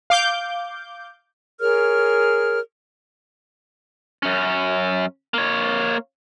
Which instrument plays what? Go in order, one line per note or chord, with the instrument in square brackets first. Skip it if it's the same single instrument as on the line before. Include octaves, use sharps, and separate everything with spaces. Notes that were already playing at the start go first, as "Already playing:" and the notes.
[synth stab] F5 D6 G6
[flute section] G#4 A#4 C#5 F6
[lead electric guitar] F#2 C#4
A#3 C#5